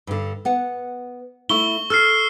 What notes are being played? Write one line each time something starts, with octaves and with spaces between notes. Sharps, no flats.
G2 D3
B3 F#5
A3 E4 C#6 G7
A4 E6 F6 C7